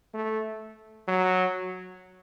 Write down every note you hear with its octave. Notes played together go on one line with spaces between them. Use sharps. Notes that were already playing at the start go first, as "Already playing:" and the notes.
A3
F#3